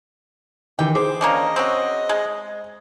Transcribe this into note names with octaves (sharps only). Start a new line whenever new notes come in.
D#3 E3 G4 G5
G#4 C5 D6
A#3 C#4 D4 D#5
C4 C#4 F#4
G#3